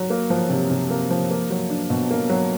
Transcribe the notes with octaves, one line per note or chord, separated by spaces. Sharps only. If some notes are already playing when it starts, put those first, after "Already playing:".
Already playing: F#3
A#3
F3
C3
C3
A#3
F3
A#3
F#3
D4
B2
A#3
F#3